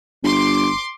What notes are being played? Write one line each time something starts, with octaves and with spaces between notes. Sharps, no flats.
G1 C6 D6